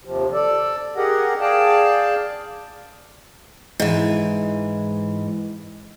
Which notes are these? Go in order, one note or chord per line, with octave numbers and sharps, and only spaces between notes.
D#2 C3 F3
A4 D5
G4 G#4 A#4 D#5 F#5
G#4 D5 F5 G5 A5
G#2 E3